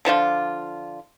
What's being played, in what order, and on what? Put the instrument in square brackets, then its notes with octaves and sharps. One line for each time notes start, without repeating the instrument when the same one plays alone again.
[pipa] D3 F3 D4 F4